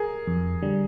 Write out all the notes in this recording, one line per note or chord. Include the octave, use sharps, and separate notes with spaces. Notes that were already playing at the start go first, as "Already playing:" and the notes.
Already playing: G#4 A#4
F2
D3 G3